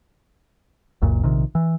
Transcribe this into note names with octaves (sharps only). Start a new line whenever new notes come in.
F#1 C#2 F#2 A#2
A#1 C3 D#3
E3